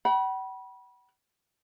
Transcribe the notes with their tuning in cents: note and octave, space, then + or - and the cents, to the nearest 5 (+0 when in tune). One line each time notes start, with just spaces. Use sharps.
F#5 +45 B5 -25